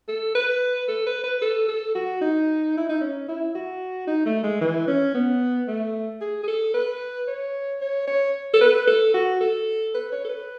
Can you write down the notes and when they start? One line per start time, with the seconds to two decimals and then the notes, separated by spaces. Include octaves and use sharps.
0.08 A4
0.35 B4
0.89 A4
1.07 B4
1.24 B4
1.42 A4
1.68 A4
1.95 F#4
2.21 D#4
2.77 E4
2.89 D#4
3.01 C#4
3.29 E4
3.55 F#4
4.08 D#4
4.26 A3
4.44 G#3
4.61 E3
4.88 C#4
5.15 B3
5.68 A3
6.21 G#4
6.44 G#4
6.48 A4
6.74 B4
7.28 C#5
7.81 C#5
8.08 C#5
8.54 A4
8.61 B4
8.88 A4
9.14 F#4
9.41 A4
9.94 B4
10.12 C#5
10.25 A4
10.29 B4